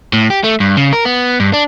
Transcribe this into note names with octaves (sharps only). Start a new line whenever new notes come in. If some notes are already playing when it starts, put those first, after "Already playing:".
A2
G4
A3
G2
C#3
A#4
B3
G2
D4